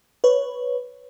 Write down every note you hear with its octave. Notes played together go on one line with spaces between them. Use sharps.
B4 C#5